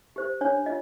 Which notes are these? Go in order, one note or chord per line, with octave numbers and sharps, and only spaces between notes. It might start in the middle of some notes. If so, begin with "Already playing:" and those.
G4 C5
D4 C#5
F4 D#5